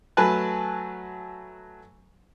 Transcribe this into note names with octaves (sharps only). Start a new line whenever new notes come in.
F#3 A3 B4 G#5 A5 F#6